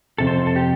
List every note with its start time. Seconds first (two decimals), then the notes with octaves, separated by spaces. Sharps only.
0.18 F2 C3 A4
0.27 C5
0.47 A4
0.56 G4